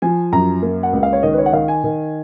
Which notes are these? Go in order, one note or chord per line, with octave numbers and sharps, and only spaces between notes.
F3 G#5
F#2 A#5
A#3
F#5
C#2
F5
C#5
D#3 D#5
B4
C#5
F#5
D#3 F5
G#5
D#3